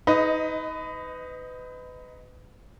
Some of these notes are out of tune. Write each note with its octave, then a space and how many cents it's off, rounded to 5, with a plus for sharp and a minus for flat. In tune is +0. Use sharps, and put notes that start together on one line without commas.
D#4 +25 B4 +30 D#5 +0